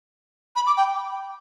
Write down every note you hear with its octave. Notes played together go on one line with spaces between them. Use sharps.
B5
D6
G5